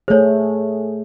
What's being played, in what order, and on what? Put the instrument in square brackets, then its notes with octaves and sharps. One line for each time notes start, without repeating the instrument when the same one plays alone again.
[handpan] A3 G#4 [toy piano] C5 C#5